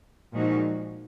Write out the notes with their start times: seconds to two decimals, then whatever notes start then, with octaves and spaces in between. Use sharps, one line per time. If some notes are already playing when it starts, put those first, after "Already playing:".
0.32 A#2 F3 G#3 D#4 F#4